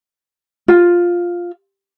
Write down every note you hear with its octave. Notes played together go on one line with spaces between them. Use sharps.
F4